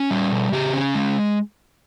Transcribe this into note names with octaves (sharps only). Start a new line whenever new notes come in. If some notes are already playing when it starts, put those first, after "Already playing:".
Already playing: C#4
G3
B2
C#3 G4
C#4
G#3